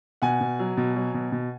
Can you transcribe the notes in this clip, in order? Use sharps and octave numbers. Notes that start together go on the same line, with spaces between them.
B2 F#5 G#5
B2
F#3
B2
F#3
B2
B2